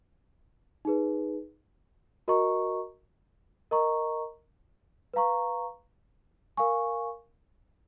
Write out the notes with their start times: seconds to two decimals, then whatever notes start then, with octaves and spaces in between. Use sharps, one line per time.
0.85 D#4 G#4 B4
2.28 F#4 A#4 D#5 A#5 C#6
3.71 A#4 D#5 A#5 C#6
5.14 B4 F5 A#5 C#6
6.57 A#4 F5 G#5 C#6